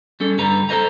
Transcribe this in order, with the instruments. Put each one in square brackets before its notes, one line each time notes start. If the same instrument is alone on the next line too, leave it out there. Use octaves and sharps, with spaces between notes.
[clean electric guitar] G3 C#4 A4
G2 D3 G3 B4 A#5
A4 A#4 C5 D#5 A#5